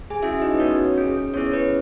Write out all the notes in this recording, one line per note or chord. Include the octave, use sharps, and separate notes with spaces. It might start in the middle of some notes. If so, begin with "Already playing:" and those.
G#4 G#5
C#4 E4 F#4 E5
D#4 D#5
B4
B3 C#4 F#4 C#5
C#4 G#4
B3 C#4 E4 G#4 C#5
C#5
B4